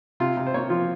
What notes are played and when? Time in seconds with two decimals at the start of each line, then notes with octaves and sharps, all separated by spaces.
0.20 C3 F4
0.37 C3
0.47 C5
0.54 A#3 C#5
0.70 F3 F4